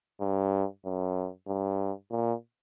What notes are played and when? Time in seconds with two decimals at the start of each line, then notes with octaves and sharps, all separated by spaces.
0.21 G2
0.85 F#2
1.48 G2
2.11 A#2